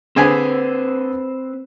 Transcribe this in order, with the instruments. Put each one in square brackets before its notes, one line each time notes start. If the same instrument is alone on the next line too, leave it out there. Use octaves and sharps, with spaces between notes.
[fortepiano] D3 G#4 G#5 [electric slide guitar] C4 B4 C5